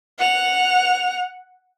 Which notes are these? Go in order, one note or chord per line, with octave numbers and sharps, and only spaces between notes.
F#5 F7